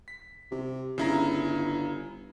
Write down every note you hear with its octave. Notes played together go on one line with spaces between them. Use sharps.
B6
C3
G1 C#3 E4 A#5